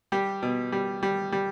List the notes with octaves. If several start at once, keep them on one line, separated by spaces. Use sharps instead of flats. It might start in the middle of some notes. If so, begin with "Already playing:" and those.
G3 G4
B2
G3
G3
G3